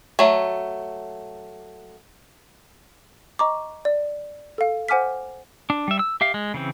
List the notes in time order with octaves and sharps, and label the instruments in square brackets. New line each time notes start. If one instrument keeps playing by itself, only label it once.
[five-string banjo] F#3 A3
[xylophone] D#5 A#5 C#6 D6
D5
A4 F5
C5 F#5 G#5 D6 F6 B6
[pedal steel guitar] D4
G3 E5
E6
G4 E5 F5
G#3
C#3 E3 C4